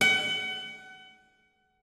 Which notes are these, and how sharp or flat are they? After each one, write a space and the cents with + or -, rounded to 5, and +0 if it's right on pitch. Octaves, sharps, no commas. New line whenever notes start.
F#5 +30